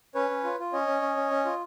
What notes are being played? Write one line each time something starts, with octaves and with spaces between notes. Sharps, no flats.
C#4 B4 C#5
C#4
F4
F4
C#4 C#5 D#5
C#4
C#4
C#4
C#4
F4